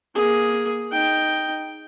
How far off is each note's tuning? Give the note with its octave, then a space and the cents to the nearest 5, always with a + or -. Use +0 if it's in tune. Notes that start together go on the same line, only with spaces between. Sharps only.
A#3 +15 G#4 +0
D#4 +0 G5 +0